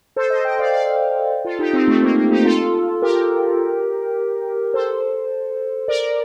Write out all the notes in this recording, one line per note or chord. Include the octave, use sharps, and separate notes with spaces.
A4 C5
C5 D#5
D#5 G5
D5 F5
D5 F5
F4 A4
D#4 G4
C4 D#4
A3 C4
A#3
A#3
D#4 G4
F4 A4
G4 A#4
A4 C5
A#4 D5